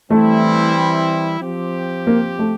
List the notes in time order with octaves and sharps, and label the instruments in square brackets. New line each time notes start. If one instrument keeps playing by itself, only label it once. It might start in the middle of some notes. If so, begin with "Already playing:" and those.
[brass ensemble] E3 G3 C4 E4 [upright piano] A3
[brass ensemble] F3 C4 G4
[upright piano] A#3
A3